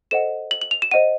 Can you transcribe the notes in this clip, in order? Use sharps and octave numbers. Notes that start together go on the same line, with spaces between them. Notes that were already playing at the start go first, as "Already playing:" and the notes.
A4 C5 D#5 F#5 E7
F#7
F#7
F7
E7
C5 D#5 F#5 D#7